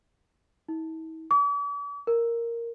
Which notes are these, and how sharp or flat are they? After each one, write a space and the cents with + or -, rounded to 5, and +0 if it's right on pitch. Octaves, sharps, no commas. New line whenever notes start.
E4 -45
D6 -45
A#4 -5